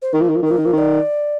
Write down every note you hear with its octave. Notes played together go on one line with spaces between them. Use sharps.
C5
D#3 A#4
F3
D#3
F3
D#3
F3 A#4
D#3
F3
D#3
D5